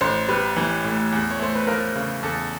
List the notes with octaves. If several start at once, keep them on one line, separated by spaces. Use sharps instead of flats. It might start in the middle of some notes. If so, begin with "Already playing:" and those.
A1 C5
G3 B4
E3
A2
E2
C#5
A3 C5
B4
F3 A#4
C#3
E2 A4